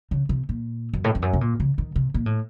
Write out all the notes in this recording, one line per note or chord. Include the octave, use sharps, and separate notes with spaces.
C#3
C3
A#2
F#2
A2
F2
F#2
C3
A#2
C#3
D#3
C3
A#2
A2